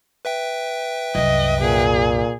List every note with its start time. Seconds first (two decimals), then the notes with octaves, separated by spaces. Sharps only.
0.25 B4 E5 G5
1.15 C2 F#2 D#5
1.61 A#2 G#4